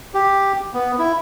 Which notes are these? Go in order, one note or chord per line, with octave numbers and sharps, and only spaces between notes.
G4
B3
E4